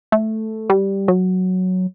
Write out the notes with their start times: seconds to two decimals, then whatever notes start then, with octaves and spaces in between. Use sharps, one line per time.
0.12 A3
0.70 G3
1.08 F#3